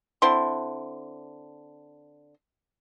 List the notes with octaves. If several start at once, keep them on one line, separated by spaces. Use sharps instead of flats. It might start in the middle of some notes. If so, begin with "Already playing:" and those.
D3 C4 E4 C6